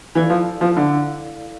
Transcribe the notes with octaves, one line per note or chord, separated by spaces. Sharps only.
E3 E4 A4 D5 F5
F3
F3
D3